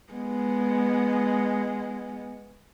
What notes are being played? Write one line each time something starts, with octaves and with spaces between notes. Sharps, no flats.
G#3 B3